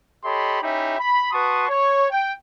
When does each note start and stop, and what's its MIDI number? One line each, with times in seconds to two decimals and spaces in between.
0.23 0.61 67
0.23 0.61 69
0.23 0.61 73
0.23 0.61 75
0.23 0.61 83
0.23 0.61 84
0.62 0.95 61
0.62 0.95 63
0.62 0.95 64
0.62 0.95 67
0.62 0.95 76
0.62 0.95 83
0.98 1.31 83
1.32 1.64 66
1.32 1.64 71
1.32 1.64 81
1.32 1.64 84
1.32 1.64 85
1.32 1.64 87
1.68 2.05 73
2.10 2.31 79